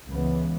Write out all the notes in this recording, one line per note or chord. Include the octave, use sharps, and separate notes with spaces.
C#2 C#3 E3 B3